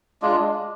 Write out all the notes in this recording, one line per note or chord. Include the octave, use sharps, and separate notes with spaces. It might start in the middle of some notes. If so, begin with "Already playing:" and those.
G#3 D4 F4